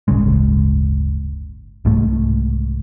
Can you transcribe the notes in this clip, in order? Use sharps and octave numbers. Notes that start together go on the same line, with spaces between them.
D1 G1 C#3 G#3
C2 G#2 A3